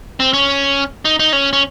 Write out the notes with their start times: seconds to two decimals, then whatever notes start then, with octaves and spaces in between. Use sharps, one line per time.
0.20 C4
0.33 C#4
1.05 D#4
1.20 D#4
1.33 C#4
1.53 C#4